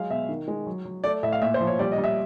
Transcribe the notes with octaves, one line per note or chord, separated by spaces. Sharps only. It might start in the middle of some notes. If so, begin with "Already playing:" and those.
Already playing: F#3 G#3 F5
B2 E5
D#3
G#3
F#3
F#3
A3 D5
A2 E5
F5
A#2 E5
C5
F3
C#5
G3 D5
D#5
G3
E5